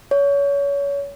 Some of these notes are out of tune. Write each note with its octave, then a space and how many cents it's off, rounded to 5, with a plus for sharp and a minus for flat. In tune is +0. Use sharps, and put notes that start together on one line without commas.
C#5 +30